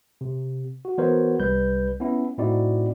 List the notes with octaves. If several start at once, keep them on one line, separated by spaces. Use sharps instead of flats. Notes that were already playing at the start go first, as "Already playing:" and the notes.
C3
F#4
E3 B3 F#4 A#4 C5 C#5
C2 G3 B4 G6
B3 C#4 E4
A2 C4 D#4 E4 F#4 D5